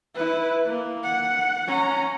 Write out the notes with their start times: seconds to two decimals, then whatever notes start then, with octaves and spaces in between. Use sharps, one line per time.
0.16 E4 B4
0.66 A#3
1.04 F#5
1.67 C#4 A#5